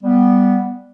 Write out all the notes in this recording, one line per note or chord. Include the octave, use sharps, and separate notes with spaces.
G3 B3